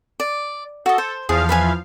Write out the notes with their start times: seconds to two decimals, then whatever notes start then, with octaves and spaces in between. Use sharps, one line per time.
0.20 D5
0.86 F#4 A4 D#5
0.98 C5
1.29 E2 F3 G#4 F5
1.49 B4 E5 G#5